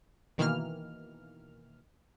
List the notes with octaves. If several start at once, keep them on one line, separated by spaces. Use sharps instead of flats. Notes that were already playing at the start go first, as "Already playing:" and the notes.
B2 D#3 E3 A#3 F6